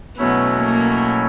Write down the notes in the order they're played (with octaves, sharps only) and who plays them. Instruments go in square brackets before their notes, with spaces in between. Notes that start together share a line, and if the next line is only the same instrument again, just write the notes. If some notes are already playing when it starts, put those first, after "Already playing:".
[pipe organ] B2 F#3 A3 C#4 E4 [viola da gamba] B3
[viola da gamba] A#3